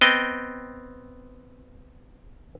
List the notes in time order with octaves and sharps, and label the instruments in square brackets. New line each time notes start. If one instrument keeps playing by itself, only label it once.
[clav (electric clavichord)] B3 C4 D#5 G5